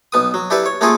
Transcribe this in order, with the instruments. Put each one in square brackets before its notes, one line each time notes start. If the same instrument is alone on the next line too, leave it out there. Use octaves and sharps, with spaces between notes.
[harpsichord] B1 B3 D#6
F#3
D4 E4 G4 A4 B4
C#5
A3 A#3 C#4 F4 G#4 A4